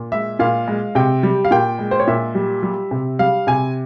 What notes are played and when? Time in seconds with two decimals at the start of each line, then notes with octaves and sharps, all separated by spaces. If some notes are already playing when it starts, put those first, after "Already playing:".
Already playing: A#2
0.12 G#3 E5
0.39 A#2 F5
0.68 G#3
0.95 C3 G5
1.23 G3
1.45 F5
1.51 A#2 G5
1.79 G#3
1.91 C5
2.00 C#5
2.07 A#2 E5
2.35 G3
2.63 G3
2.91 C3
3.19 G3 F5
3.47 C3 G#5